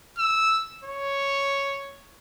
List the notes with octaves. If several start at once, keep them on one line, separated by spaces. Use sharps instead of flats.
E6
C#5